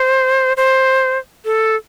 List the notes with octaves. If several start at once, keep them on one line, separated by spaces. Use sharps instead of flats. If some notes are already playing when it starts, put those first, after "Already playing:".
Already playing: C5
C5
A4